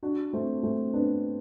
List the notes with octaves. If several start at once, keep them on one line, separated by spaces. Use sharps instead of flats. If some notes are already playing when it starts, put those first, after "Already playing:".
D4 F#4
A3 C4
A3 C4
B3 D4